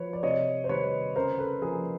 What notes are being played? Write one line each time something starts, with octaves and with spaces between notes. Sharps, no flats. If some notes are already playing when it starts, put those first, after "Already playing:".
Already playing: F3 B4 C#5
D5
C3 C#5 D#5
C5
D#3 G3 B4 C#5
C#3 A#4 C5
A4 B4
F3 G#4 A#4